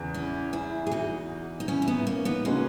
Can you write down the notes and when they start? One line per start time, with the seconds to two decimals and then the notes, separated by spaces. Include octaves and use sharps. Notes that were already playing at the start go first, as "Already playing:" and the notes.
Already playing: E2 C#3 E3
0.14 C#4 E4
0.53 E4 G#4
0.87 G#4
0.91 D#4 F#4
1.60 D#4
1.68 C#4 E4
1.82 E4
1.88 B3 D#4
2.07 A#3 C#4
2.25 B3 D#4
2.45 C#3 G#3 A#3 C#4 D#4 F#4